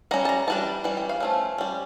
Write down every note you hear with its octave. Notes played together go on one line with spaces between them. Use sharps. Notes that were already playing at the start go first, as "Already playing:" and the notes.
G3 C#4 A#5
A5
A#5
E3 G3 D4 A5
E3 G3 C#4
G5
F5
F3 A3 C#4
G3 C#4